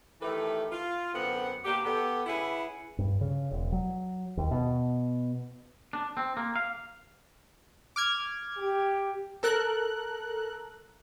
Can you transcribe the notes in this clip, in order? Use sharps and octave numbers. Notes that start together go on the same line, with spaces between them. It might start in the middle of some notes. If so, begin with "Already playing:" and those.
D#3 E3 A3 G4 A4 B4
F4
F#2 D3 B3 C4 F#5
B2 A#3 D4 G4
B3 G4 A4
C#3 E4 G#4 B4 E5 F#5
G2
C#3
E1
F#3
D#2
B2
D4
C4
A#3
F5
D6 F6 G#6
G4
A4 A#4 F#6